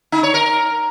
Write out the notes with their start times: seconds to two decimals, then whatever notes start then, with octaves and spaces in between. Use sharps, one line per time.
0.12 D#4
0.23 C#5
0.34 A#4